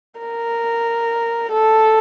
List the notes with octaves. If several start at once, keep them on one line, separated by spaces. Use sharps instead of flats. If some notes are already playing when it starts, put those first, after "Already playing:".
A#4
A4